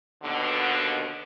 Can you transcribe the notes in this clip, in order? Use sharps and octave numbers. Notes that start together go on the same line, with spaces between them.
D#2 B2 D3